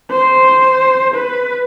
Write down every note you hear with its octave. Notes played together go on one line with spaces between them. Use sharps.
C5
B4